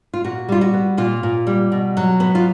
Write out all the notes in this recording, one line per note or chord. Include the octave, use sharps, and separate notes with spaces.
F4
A#2 F#4
G3 F4
F#4
B3
A#2 F4
A#2
G3
B2
F#3
B3
F4